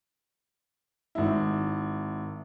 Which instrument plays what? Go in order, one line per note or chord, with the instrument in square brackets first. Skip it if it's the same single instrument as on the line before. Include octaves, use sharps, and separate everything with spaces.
[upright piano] G#1 E4